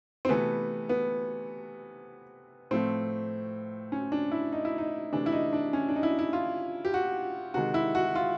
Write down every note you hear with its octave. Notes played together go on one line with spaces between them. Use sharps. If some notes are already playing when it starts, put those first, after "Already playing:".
C4
C3 E3 A3 B3
B3
A2 F3 A3 C4
C#4
D4
E4
D#4
E4
D#4
C3 E3 A3 D4
E4
D#4
D4
C#4
D4
D#4
E4
E4
F4
G4
F#4
C3 D#3 G#3 F#4
E4
F#4
F4